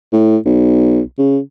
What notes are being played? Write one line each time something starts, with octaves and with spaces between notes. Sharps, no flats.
A2
B1
C#3